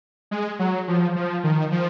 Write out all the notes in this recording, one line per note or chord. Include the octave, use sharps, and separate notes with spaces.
G#3
F#3
F3
F3
D#3
F3